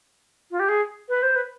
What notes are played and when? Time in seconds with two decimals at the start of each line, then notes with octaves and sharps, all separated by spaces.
0.51 F4
0.60 G4
0.69 G#4
1.09 B4
1.22 C5
1.36 B4